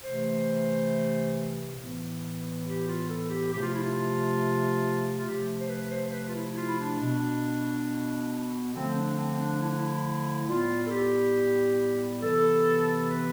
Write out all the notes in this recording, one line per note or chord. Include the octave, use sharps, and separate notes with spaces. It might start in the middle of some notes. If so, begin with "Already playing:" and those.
C3 E3 A3 C5
A2 E3 B3
G4
F4
A4
G4
C3 F3 A3 G4
F4
E4
F4
F4
C3 F3 A3 G4
C5
B4
C5
C5
B4
F4
E4
E4
F4
E4
D4
B2 B3
D3 F3 A3 C4
D4
C4
D4
E4
D4
E4
A2 G3 B3 F4
A4
G4
C3 E3 B3 A4
B4